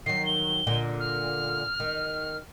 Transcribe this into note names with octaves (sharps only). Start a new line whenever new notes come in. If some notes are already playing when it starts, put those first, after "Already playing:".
D#3 F#3 C7
G7
A#2 D3
F6
D#3